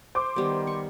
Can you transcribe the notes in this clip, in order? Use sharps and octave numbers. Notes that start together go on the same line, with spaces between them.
C5 D6
D#3 G3 B3
C#6